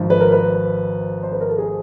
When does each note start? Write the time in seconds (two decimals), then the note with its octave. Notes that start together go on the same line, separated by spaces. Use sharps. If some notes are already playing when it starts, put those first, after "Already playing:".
Already playing: G#1 G#2 F3
0.10 B4
0.20 A#4
0.32 B4
1.23 C5
1.32 B4
1.41 A#4
1.49 A4
1.58 G#4